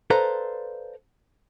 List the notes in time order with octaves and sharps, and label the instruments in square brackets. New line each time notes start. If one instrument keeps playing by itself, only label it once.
[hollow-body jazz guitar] A4 B4 C5 D5 F5 A#5